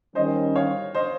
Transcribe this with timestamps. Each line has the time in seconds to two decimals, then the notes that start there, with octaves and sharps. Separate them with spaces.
0.15 D#3 G3 C#4 C5 D#5
0.56 C#5 F5
0.95 C5 D#5